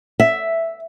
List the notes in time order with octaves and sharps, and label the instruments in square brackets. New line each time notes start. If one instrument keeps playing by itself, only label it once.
[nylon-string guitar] E5